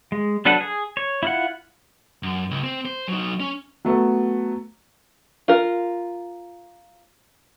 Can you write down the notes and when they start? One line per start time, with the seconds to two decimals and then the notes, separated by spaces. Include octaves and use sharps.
0.12 G#3
0.45 F#3 D4 A4 B4 F#5
0.61 G#4
0.97 C#5
1.23 E4 F4 F#5
2.23 F#2
2.51 C#2
2.64 C4
2.85 C5
3.08 F#3 D#4
3.40 C#4
3.85 F#3 A3 B3
5.48 F4 A#4